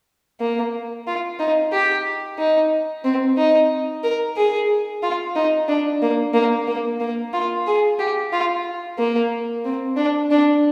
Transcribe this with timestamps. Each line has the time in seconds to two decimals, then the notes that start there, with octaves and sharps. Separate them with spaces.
0.40 A#3
1.07 F4
1.39 D#4
1.73 G4
2.38 D#4
3.04 C4
3.37 D#4
4.03 A#4
4.36 G#4
5.03 F4
5.35 D#4
5.68 D4
6.02 A#3
6.34 A#3
6.67 A#3
7.00 A#3
7.33 F4
7.67 G#4
7.99 G4
8.32 F4
8.98 A#3
9.65 C4
9.96 D4
10.31 D4